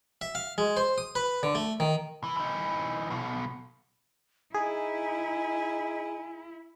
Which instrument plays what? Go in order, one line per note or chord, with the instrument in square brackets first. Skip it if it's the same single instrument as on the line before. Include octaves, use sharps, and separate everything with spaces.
[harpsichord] E5
F5
G#3
C5
D#6
B4
D3
A3
D#3
[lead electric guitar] E3
E3 D#4
B1 B2
[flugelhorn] D#4 [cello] E4 [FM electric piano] G#4 [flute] G#5